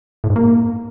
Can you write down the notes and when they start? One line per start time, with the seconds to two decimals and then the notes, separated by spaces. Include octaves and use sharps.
0.24 A2
0.30 G#2
0.36 A#3